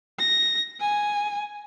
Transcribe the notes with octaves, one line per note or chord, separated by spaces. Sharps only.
A#6
G#5